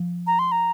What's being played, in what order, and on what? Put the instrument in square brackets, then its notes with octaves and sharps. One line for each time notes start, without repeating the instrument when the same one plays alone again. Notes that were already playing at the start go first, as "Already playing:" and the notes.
Already playing: [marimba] F3
[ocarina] A#5
C6
A#5